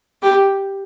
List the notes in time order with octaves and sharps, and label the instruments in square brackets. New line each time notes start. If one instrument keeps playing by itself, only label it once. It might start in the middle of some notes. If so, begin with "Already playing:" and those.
[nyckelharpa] G4